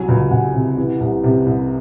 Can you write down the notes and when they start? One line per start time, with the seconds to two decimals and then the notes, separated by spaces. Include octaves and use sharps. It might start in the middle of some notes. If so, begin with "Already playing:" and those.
Already playing: C2 F#3 G#5
0.08 C#2
0.31 C#2 F#5
0.54 C3
0.77 E3
1.00 C2
1.23 C3
1.46 C2